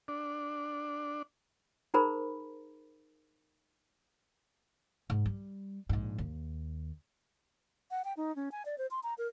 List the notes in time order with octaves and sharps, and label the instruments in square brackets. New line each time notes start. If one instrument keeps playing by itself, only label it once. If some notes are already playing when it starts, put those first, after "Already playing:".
[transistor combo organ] D4
[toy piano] D#4 G#4 A#4 C5 A#5 B5
[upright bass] G#2
G3
A#1 G#2
D#2
[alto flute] F#5
G5
D#4
C#4
G#5
D5
C5
C6
A#5
A#4